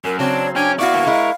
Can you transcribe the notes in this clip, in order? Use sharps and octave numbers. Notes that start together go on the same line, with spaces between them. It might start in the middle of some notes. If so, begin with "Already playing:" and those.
F#2 A#4
C#3 F#3 C4 D4 C#5
C#4 D4 G5 G#5
B3 E4 F#4 D5 F5 C#6
D3 A#3
G#3 E4 A#4